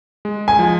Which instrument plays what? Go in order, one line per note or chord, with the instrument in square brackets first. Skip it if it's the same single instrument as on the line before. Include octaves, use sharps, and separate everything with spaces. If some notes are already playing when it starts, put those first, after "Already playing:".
[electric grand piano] G#3
[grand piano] G#5
[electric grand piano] F3